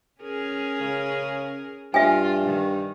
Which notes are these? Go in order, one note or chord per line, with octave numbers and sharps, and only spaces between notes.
C#4 G#4 A#4
C#3
G2 F4 E5 G#5
D#3